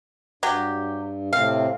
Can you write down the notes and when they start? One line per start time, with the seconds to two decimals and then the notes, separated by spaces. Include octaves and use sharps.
0.43 G2 F#3 G4
1.33 A2 C3 C4 F5